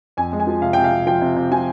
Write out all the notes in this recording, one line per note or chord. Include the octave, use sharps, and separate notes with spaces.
F2 G#5
G#3
G#5
F3
C3 F5
C3 G5
F5
C3
F3 G5
C3
C3
F3 G#5